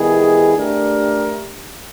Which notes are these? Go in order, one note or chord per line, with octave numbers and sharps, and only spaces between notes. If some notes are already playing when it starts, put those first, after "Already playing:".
Already playing: D#3 G3 B3 E4 G#4
A3 D4 G4 A#4